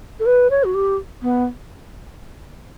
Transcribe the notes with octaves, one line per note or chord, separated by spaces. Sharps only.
A4
B4
C#5
F#4
G4
B3